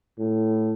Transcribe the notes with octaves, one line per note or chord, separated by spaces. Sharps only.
A2